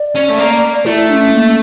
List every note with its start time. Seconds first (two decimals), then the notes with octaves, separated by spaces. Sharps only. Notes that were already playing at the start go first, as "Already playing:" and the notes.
Already playing: D5
0.16 C#4
0.30 A3
0.39 A#3
0.86 A3 E4
1.09 D4
1.14 C#4
1.33 A#3